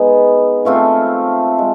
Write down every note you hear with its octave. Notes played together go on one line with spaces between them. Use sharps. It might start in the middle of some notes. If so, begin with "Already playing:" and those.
Already playing: G#3 B3 D#4
F3 A3 C4 F4
G#3